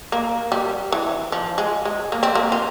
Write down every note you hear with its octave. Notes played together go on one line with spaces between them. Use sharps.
A#3
G3
E3
F3
G#3
G#3
A#3
C4
A#3
F4